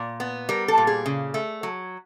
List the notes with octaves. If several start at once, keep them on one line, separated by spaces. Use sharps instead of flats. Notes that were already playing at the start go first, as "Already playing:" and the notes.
Already playing: A#2
B3
G3 A#4
A4
A#2
G#4
C#3
A3
F#3